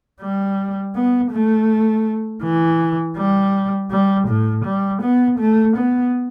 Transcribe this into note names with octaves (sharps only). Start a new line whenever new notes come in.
G3
B3
A3
E3
G3
G3
A2
G3
B3
A3
B3